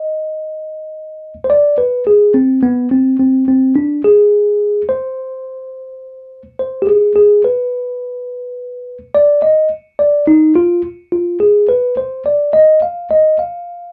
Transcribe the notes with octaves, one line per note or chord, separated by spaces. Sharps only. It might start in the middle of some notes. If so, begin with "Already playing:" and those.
Already playing: D#5
C5
D5
B4
G#4
C4
B3
C4
C4
C4
D4
G#4
C5
C5
G4
G#4
G#4
B4
D5
D#5
D5
D#4
F4
F4
G#4
B4
C5
D5
D#5
F5
D#5
F5